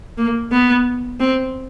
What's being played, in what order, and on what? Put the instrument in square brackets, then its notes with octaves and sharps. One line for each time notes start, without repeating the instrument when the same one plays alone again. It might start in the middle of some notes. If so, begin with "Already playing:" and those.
[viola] A#3
B3
C4